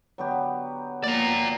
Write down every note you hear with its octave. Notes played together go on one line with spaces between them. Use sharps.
D3 F#3 B3 G4
F3 A#3 D5 A#5